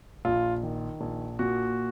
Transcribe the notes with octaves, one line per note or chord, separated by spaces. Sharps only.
A#1 F4
D#3
A#1
A#2 F#4